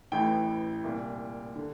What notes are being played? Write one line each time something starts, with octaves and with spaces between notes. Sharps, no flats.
A1 A2 E3 G5
C2 A#2
D3